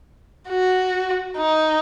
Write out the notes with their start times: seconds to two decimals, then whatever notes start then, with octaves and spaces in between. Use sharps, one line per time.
0.49 F#4
1.38 D#4